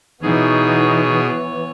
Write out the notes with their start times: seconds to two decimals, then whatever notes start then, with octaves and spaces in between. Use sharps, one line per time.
0.22 B2 E3 B3 D#4 G#4 C#5